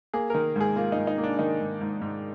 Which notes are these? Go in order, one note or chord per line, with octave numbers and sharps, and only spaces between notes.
A#3 G#4
D#3 A#4
G#2 G#4
A#3 F4
D#4
G#2
D#4
A#3
D4
D#3 D#4
G#2
G#2
G#2